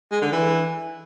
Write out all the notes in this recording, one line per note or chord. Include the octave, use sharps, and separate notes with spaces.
G#3
D3
E3